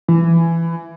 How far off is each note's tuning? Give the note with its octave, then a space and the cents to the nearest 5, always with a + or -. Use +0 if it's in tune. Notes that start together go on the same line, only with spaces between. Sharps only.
E3 +20